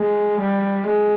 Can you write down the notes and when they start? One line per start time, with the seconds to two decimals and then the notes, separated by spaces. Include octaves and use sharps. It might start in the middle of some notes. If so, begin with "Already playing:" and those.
Already playing: G#3
0.41 G3
0.86 G#3